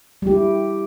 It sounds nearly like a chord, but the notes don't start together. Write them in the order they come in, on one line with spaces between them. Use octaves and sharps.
G3 G4 E4